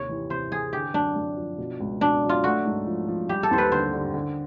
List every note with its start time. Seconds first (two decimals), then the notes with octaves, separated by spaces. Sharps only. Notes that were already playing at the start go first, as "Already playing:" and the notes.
Already playing: D#2 C3 C#5
0.09 E3
0.30 C3 C5
0.51 E3 G#4
0.73 D3 G4
0.94 F#2 D4
1.16 F#2
1.37 F3
1.58 B2
1.80 C#2
2.01 B2 D4
2.23 F#3
2.29 F4
2.44 A3 F#4
2.65 G#2
2.86 F3
3.08 F3
3.29 G3 G4
3.43 A4
3.51 D#2 C5
3.58 B4
3.72 D3 C5
3.93 D3
4.14 D3